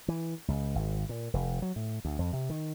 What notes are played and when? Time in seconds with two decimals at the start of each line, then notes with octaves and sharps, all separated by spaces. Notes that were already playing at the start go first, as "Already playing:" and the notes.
0.08 E3
0.48 C#2
0.75 G#1
1.09 A#2
1.34 F1
1.62 F#3
1.76 A2
2.05 D2
2.19 F2
2.33 C3
2.50 D#3